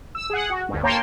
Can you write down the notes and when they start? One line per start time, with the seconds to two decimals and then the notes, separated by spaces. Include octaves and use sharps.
0.15 E6
0.30 G#4 F#5
0.50 F#4
0.69 D2 G2
0.83 A#3 C#5 G5 A5 A#5 C6